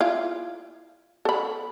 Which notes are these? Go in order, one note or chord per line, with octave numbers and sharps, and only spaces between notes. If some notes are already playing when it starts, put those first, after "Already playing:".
E4 F4
A4 B5